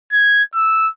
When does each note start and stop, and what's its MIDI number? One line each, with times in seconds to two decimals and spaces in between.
0.13 0.43 92
0.54 0.89 88